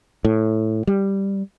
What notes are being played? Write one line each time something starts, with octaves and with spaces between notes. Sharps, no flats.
A2
G3